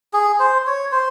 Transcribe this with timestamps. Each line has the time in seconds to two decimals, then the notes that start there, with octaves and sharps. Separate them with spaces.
0.14 G#4
0.40 C5
0.67 C#5
0.92 C5